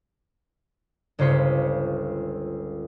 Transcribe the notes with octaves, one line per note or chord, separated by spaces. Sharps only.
G1 C#2 C#3 C5 C#6 B6